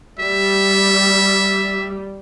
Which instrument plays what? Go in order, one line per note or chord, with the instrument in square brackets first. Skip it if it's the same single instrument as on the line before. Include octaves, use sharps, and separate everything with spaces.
[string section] G3 [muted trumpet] E5